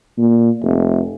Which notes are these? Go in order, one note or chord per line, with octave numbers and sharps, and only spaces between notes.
A#2
F1